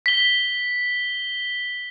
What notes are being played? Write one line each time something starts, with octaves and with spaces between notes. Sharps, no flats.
B6 G7